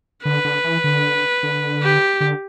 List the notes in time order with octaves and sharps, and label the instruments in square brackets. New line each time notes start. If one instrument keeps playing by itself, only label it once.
[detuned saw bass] D3 [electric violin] B4
[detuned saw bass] D3
E3
D3
D3
[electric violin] G4
[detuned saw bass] D3